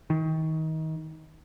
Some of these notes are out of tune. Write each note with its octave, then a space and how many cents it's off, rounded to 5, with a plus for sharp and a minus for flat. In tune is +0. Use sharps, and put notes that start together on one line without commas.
D#3 +30